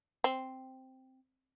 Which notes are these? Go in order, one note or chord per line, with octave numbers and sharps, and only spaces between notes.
C4